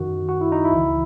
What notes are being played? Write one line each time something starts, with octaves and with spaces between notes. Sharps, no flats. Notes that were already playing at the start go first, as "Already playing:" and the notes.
Already playing: F#2 D#3 F#4
F#4
E4
D#4
E4
C#2 C#3 E3